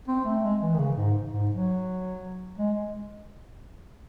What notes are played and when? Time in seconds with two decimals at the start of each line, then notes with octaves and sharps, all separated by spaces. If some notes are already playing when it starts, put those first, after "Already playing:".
0.08 C4
0.25 A3
0.43 G#3
0.62 E3
0.74 D#3
0.79 C#3
0.97 G#2
1.32 G#2
1.51 F#3
2.58 G#3